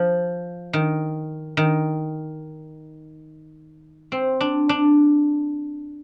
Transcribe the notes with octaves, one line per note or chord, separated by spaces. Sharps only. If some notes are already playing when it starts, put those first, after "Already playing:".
Already playing: F3
D#3
D#3
C4
D4
D4